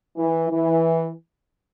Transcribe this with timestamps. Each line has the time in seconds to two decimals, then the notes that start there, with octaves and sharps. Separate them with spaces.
0.17 E3
0.50 E3